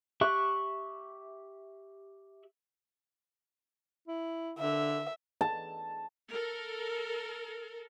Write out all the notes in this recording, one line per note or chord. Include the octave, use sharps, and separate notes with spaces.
G4 E5 C#6 F#6
E4
D3 E5
A5
A4 A#4